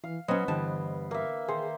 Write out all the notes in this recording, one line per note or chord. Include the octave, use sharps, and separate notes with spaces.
E3 F5
F#3 B3 C#4 C5 D#5
G2 D3 E3 A5
A#3 E5
D#3 G#4 C5